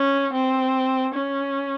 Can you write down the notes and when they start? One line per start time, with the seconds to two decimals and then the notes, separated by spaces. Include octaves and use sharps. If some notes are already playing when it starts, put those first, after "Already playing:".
Already playing: C#4
0.32 C4
1.14 C#4